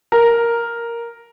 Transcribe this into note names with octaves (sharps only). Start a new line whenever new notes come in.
A#4